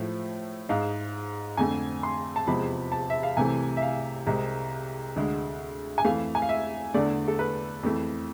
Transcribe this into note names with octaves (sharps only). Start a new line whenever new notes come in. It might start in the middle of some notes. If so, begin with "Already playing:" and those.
Already playing: A2 F3 A3
G#2 G#3 F5
F2 D3 A3 G#5
C6
A5
E2 C3 F3 G#3 B5
A5
E5
F5
C2 C3 E3 A3 G#5
E5
F5
C2 C3 G#3
D2 D3 G#3
G#5
F2 E3 A3 F5
G#5
F5
E5
E2 D3 A3 D5
A4
B4
F2 E3 A3